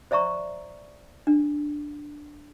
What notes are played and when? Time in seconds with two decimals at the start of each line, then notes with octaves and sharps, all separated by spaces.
0.11 C5 D5 E5 A#5 C#6
1.27 D4